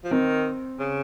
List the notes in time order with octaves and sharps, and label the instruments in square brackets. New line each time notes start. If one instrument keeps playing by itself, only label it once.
[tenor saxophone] F3
[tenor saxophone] D#3 [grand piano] C4
[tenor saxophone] C#3